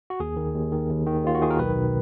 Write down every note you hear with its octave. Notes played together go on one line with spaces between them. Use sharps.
F#4
D#2 G#4
D#3
D#2
D#3
D#2
D#3
D#2 F4
F#4
D#3 G#4
A#4
B1 B4
B2